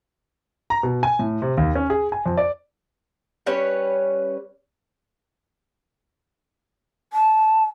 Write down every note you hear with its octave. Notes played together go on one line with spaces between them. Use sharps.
A#5
B2
G#5
A2
C3
D#2
C#4
G#4
G#5
F2
D5
G3 C#4 B4 C#5
A5